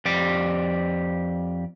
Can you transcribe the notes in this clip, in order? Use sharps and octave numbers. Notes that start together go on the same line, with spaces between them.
F2 G4 D5